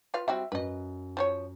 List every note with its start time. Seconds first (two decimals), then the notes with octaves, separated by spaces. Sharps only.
0.14 F4 B4 F5
0.28 G3 C4 F#4 E5
0.52 F#2 B4 D#5
1.17 F3 C5 C#5